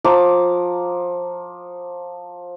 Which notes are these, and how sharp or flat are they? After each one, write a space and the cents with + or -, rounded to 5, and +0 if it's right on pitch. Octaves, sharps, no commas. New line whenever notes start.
F3 +20 A#5 +0 D6 -5